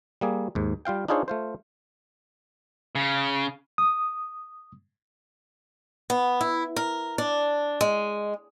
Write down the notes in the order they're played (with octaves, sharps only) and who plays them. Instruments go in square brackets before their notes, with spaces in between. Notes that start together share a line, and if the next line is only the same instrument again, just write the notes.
[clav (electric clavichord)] G3 A#3 G#4
D#2 G#2
G3 F4 F5 G5
D4 D#4 F4 G#4 C5 C#5
A3 F4 C5
[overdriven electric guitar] C#3
[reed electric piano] D#6
[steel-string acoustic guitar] B3
E4
A#4
D4
G#3